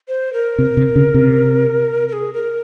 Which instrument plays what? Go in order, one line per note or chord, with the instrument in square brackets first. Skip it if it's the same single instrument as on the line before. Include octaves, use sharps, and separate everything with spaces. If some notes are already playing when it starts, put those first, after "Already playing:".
[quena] C5
A#4
[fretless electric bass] C3
C3
C#3
C3
[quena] A#4
G#4
A#4